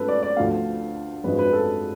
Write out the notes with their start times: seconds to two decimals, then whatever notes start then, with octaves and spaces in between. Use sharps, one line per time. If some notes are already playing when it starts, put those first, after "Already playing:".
Already playing: G#2 F#3 A3 C#4 F4 A4 B4
0.08 D5
0.23 D5
0.37 D2 D3 F3 A3 F5
1.24 G#1 F#2 F3 G#3 D4 B4
1.39 B4
1.53 A4